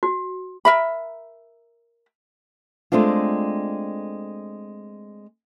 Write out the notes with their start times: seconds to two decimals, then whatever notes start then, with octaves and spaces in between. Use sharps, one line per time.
0.03 F#4
0.65 A#4 E5 B5
2.92 G#3 A3 C4 D4 F4